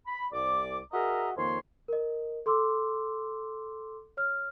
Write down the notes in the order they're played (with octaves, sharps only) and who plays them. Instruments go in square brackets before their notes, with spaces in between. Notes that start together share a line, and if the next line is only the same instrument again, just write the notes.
[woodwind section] B5
C2 D5 D6
F#4 G#4 A#4 D#5 E5 A#5
F2 D#3 A#3 C#5 C6
[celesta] A#4 D#5
A4 C6 D6 E6
C#5 F6